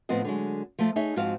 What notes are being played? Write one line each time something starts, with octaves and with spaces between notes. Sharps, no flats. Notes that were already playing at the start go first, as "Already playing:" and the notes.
A2 F3 B3 C4 D#5
D3 F#3 G#3
F3 A3 F4
D#4 G#4 C#5 E5
G#2 F3 C4 F#4 F5